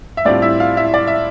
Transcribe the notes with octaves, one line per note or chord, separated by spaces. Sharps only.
E5
A2 G3 C4 D4 F4 D5
E4 E5
F4 F5
E4 E5
D5
E5